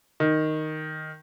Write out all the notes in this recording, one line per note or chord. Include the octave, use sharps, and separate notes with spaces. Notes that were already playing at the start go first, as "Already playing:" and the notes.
D#3